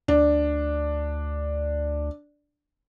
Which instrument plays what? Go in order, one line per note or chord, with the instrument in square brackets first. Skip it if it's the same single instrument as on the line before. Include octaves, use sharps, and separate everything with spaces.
[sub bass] D2 [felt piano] D4